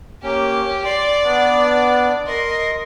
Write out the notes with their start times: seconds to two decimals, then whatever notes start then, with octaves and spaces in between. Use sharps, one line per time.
0.23 A#3 C#4 G4
0.85 D5 C6
1.24 B3 D4
2.27 A#4 D#5 C6